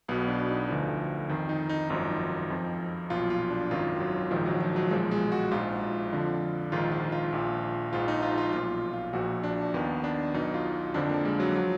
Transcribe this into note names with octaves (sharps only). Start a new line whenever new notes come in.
B1 B2 B3
D4
D#4
D2 D3 F3
F2 D#3
D#4
D#4
G#1 F#2 F3 D#4
F2 F3
B1 A#2 F3 F4
F4
D4
G#1 F#2 D#3 F4
F#3
A#1 G#2 D#3 F3
F#3
F3
F#3
B1 A#2 F3 G#3
G#3
F#4
A#1 G#2 F3 F4
F2 D3 F3
A#1 G#2 D#3 F4
F4
F4
A#1 A#2 F3
A#1 G#2 F3 F4
D#4
F4
F4
B1 A#2 F3 F4
F4
A#1 A#2 F3 F#4
D4
D#2 D#3 B3
D4
B1 B2 D#4
F4
F2 D3 F3 D4
A#3
G#3
F#3
F3 F#3